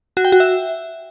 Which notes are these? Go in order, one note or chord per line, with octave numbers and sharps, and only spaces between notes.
F#4
G5
F#4
E5